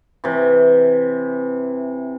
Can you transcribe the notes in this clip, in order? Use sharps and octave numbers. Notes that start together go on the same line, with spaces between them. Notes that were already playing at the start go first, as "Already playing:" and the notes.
C3 E3